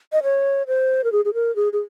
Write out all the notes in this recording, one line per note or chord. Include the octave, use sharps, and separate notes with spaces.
D#5
C#5
C5
A#4
G#4
G#4
A#4
G#4
G#4